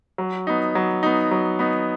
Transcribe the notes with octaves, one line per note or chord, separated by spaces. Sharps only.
F#3
B3 D#4
F#3
B3 D#4
F#3
B3 D#4